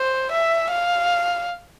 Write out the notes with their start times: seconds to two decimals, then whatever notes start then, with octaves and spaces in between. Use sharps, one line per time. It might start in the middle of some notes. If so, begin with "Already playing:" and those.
Already playing: C5
0.32 E5
0.71 F5